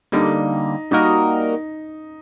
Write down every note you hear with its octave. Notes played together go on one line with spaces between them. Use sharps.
D3 G3 A#3 D#4
G3 A#3 D#4 F#4 A#4 D#5